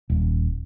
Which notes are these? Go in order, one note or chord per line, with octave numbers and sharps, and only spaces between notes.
D#1